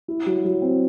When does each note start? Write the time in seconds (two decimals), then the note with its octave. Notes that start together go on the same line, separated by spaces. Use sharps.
0.08 E4
0.26 F#3
0.44 F#3
0.62 C4